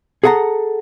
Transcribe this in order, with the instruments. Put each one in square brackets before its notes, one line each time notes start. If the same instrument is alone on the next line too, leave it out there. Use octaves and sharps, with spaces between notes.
[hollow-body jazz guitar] G#4 A4 F#5 G#5 A#5